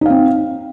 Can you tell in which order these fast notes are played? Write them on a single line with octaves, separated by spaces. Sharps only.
D#4 F5 C4